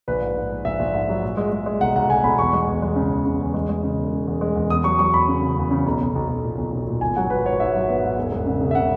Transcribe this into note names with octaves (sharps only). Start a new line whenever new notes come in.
A#1 B4
G#2
G#2
G#2
A#1 E5
A#1
G#2
F#3
A#2
G#3
G#3
G#3
B1 F#5
B1 F#5
B1 G#5
B1 B5
E2 C#6
G#3
E2
G#3
C#3
E2
C#3
E2
G#3
G#3
C#3
E1
C#3
E2
G#3
E2
E2 D#6
F#3 C#6
F#3 C#6
E2 B5
C#3
C#3
E2
C#3
B1
B1
B1
B1
A#2
B1
B1
A#2
G#1 G#5
F#3 F#5
F#3 B4
G#2 C#5
G#2 E5
F#3
B3
G#2
E1
E1
C#3
C#3
E5
C#3 F#5